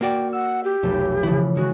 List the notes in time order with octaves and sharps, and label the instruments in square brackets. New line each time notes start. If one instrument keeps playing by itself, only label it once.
[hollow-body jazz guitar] A#3 F#4 D5 [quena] G5
[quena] F#5 [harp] E6
[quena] G4
[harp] F1 B1 A3
[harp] C#3 E3 [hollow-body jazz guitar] F3 E4
[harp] D#3 G#3 [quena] F#4